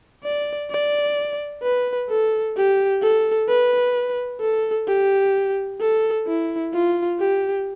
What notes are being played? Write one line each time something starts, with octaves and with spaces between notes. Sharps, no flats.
D5
D5
B4
A4
G4
A4
B4
A4
G4
A4
E4
F4
G4